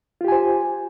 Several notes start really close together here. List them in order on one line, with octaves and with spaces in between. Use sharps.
F4 G4 G#5 C5